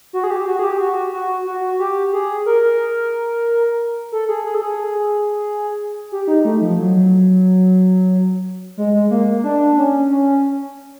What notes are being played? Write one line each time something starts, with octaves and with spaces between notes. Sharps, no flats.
F#4
G#4
G4
F#4
G#4
G4
F#4
F#4
F#4
G4
G#4
A#4
A4
G#4
G#4
A4
G#4
G4
D#4
A3
F3
F#3
G#3
G#3
A#3
A#3
D4
C#4
C#4